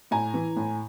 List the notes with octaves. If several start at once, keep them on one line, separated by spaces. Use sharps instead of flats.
A2 G#5 A#5
E3
A2